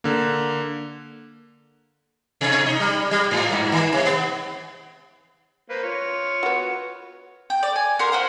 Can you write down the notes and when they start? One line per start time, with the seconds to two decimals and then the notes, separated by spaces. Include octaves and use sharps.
0.04 D3 A#3
2.41 B2
2.66 D#4
2.80 G3
3.11 G3
3.31 G#2
3.52 G2
3.72 D#3
3.92 C3
4.05 B3
5.69 A#3 B4 C5
5.83 F4 C#5
6.43 B3 F#4
7.50 G5
7.63 D5
7.76 G#5
7.99 F#4 G4 A#4 C6
8.12 F4 C5 F#5